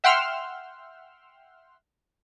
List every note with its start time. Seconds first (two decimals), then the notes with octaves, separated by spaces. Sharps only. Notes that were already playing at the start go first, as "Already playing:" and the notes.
0.04 E5 F#5 G5 C6 E6 F6